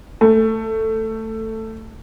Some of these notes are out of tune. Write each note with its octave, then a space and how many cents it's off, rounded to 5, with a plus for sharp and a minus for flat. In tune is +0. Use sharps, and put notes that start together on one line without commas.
A3 +10